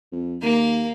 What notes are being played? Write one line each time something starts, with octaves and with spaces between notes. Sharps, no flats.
F2
D#2 A#3